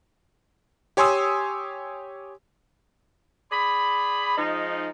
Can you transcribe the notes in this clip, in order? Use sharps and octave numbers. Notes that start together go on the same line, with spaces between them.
G4 C#5 G#5 C6 D#6 E6
G#4 D5 B5
F3 G#3 D#4